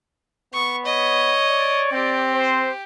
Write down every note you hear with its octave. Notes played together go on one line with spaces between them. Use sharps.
B3 C#6
C#5 D#5
D5
C4 G4
C5